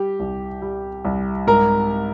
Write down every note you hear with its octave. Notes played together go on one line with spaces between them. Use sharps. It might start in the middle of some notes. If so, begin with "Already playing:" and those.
Already playing: G3 G4
C2
G3
C2
G#2 A#4 A#5